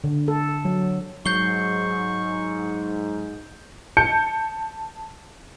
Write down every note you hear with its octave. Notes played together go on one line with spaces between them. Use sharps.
D3
A4
F#3
G#2 F#3 C#6 G6 C7 G7
A5 G6 C#7